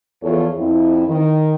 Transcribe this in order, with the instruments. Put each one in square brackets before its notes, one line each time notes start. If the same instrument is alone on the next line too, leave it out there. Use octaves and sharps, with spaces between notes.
[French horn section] E2 F3 F4 A4 C#5
F2 C4 E4
D#3